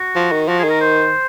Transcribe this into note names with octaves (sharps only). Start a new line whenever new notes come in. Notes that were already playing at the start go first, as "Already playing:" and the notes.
Already playing: F#4
F3
D#3
F3 F#4
G#4
D#3
A#4
C5